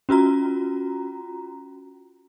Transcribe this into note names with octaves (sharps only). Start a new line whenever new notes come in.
C#4 F4 F#4 A#5